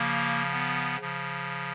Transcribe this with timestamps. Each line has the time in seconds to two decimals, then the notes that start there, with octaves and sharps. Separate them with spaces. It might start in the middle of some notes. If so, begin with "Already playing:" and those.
Already playing: C#3 F3 A#3
0.53 B3
1.01 C#3 F3